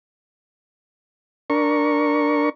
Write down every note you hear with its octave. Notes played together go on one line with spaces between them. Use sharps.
D4 A#4 C#6